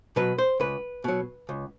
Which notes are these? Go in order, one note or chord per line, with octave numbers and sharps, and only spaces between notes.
B2 F#3 B4
C5
C#2 B4
B2 F#3
C#2